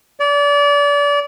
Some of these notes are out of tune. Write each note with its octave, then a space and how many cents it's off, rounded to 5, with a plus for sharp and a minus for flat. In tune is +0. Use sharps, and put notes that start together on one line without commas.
D5 -30